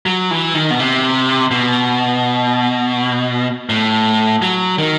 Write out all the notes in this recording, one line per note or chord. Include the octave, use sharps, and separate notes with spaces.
F#3
E3
D#3
B2
C3
B2
A2
F#3
D#3